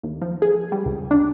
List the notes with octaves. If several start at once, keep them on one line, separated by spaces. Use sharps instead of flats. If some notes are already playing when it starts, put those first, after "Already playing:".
D#2
F3
G#4
G3
C#2
D4